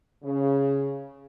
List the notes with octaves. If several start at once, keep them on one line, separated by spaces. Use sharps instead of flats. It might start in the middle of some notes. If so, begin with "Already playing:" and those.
C#3